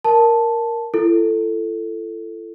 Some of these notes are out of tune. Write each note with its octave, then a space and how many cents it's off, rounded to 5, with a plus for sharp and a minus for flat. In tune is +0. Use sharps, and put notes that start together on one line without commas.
A#4 +0 A5 +0
E4 +45 A4 +5